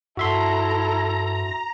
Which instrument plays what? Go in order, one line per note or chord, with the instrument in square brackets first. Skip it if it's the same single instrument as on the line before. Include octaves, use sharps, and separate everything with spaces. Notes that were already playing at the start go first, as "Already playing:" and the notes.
[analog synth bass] G2 [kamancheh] E4 A4 [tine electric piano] F#4 E5 C6 [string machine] A#5